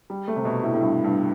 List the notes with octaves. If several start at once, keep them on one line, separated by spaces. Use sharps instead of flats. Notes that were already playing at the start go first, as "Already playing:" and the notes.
G3
A3
C3
B2
A2
A2
G2
G2